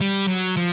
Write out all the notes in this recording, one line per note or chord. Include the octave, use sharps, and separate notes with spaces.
G3
F#3
F3